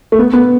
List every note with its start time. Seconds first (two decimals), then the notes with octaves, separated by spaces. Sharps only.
0.12 A3
0.19 B3
0.33 B3